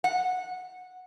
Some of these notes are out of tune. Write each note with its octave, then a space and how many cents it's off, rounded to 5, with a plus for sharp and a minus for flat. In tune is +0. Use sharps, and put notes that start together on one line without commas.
F#5 -10